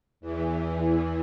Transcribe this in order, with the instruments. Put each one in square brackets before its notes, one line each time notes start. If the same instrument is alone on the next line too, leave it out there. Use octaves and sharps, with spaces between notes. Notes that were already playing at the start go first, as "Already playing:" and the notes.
[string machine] E2 E3